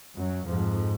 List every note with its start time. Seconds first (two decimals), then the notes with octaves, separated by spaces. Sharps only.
0.16 F#2 F#3
0.46 F2 G#2 F3